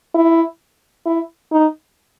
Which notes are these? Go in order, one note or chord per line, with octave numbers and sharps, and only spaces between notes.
E4
E4
D#4